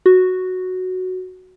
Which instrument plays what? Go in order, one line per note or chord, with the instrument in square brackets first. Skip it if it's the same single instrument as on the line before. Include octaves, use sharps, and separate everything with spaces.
[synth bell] F#4